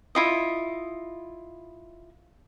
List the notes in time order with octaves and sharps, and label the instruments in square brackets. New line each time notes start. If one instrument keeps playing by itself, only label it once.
[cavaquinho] E4 F4 D#5